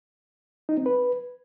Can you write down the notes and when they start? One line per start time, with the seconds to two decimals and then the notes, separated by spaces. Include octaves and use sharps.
0.69 D#4
0.77 C4
0.86 B4